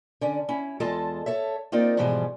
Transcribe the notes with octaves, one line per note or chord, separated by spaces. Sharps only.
D3 C#4 D5
C#4 E4
E2 G#3 F4 A4 D#5 A5
A4 C#5 E5
A#3 C4 D#4 F4 A#4 D5
G#2 B2 E3 F3 G3 G#3